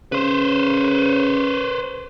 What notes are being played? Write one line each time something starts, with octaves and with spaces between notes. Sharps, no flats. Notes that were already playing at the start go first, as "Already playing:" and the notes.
C#3 B4 C5